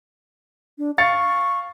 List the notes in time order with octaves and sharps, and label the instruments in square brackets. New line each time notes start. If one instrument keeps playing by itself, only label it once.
[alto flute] D4
[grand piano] F5 A6 C#7 [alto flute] C#6